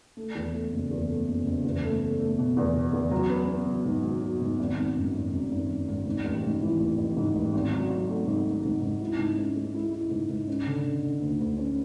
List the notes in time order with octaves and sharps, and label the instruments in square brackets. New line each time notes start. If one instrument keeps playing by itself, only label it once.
[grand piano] A3
E2
A3
F#1
E2
A3
F#1
F#1
E2
A3
A3
A3
B2
E2
B2
E2
F#3
B3
B3
F#3
G#2
F#3
F#4
G#2
G#1
G#1
F#2
G#1
F#2
G#1
G#1
G#1
G#2
A1
G#2
E3
A1
A1
G#2
A1
G#1
F#3
F#3
A3
G#2
G#1
G#2
G#2
E4
G#2
C#4
G#3
E4
E4
G#2
G#2
C#4
D3
D3
D3
D2
D2
C#4